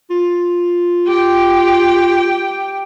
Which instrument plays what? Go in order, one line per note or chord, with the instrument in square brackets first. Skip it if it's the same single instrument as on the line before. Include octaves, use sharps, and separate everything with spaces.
[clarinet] F4
[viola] G4 G5